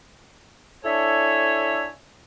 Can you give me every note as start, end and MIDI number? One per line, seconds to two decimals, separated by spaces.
0.84 1.86 62
0.84 1.86 64
0.84 1.86 69
0.84 1.86 73
0.84 1.86 76
0.84 1.86 80